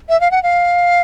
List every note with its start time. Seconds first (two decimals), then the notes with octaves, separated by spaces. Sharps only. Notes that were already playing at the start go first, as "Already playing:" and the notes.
0.09 E5
0.21 F5
0.31 F#5
0.43 F5